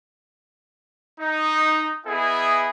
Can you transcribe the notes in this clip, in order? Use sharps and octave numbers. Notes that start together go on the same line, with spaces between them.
D#4
B3 E4 G#4 D#5 G#5